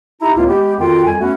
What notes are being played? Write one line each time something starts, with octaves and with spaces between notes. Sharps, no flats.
D#4 E4 G4 A#5
C#2 A2 A#3 C4 F4
G#3 B3 G4
F2 D#3 F4 F#4 G5
F2 G3 G#5
A3 B3 C#4 F#4